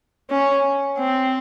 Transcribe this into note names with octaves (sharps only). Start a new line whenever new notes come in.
C#4
C4